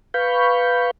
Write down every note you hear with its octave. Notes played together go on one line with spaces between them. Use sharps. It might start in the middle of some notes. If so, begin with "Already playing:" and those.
B4 F5 B5 C#6 G6